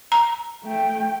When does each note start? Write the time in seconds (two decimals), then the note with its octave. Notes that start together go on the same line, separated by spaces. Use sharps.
0.12 A#5
0.65 A3 G5